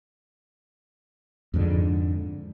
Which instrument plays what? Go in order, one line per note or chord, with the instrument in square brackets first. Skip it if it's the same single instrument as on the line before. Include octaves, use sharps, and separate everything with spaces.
[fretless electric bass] F2 G#2 D3